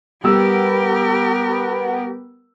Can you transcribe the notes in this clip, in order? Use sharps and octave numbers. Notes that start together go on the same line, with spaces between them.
G3 B3 G4 A#4 E6